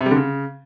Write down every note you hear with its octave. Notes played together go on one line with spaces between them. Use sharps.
C3
G3
D3
C#3